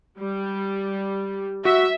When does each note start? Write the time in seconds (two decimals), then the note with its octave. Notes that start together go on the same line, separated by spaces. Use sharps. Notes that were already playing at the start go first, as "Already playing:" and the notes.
0.20 G3
1.65 F#4 E5